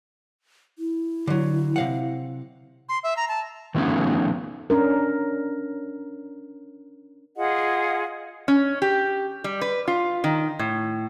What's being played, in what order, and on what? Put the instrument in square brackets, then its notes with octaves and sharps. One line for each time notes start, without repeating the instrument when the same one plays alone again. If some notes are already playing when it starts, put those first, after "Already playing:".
[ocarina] E4
[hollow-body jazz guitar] D3 F#3
C3 F5 F#5
[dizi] C6
E5
A#5
A5
[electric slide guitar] D#3 F3 A3 B3 C#4 D#4
[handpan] C#4 D4 A#4
[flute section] F4 G#4 D#5 F#5
[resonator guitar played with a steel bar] C#4
G4
G3
B4
F4
D#3
A2